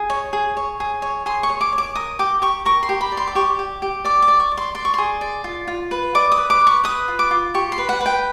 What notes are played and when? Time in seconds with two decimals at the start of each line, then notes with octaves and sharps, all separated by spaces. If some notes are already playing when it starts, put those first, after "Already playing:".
Already playing: G#4
0.10 C#5
0.33 G#4
0.57 C#5
0.80 G#4
1.02 C#5
1.26 G#4 C6
1.43 C#6
1.50 C#5
1.61 D6
1.73 C#5
1.78 D6
1.95 A#4 D#6
2.19 G4 D6
2.42 G4 C#6
2.65 A#4 C#6
2.83 C6
2.89 G4
3.01 B5
3.12 D5
3.17 C6
3.27 D6
3.35 G4 C#6
3.59 G4
3.82 G4
4.04 D5 D6
4.22 D6
4.28 D5
4.40 C#6
4.52 D5
4.57 C6
4.75 D5 C6
4.85 C#6
4.94 G#4 C6
5.21 D5
5.44 F4
5.68 F4
5.91 B4
6.15 D5 D6
6.32 D#6
6.38 B4
6.50 D6
6.61 B4
6.67 C#6
6.84 B4 D#6
7.08 F4
7.19 D6
7.31 F4
7.54 G4 C#6
7.72 C6
7.78 B4
7.89 F#5
8.01 B4
8.06 G5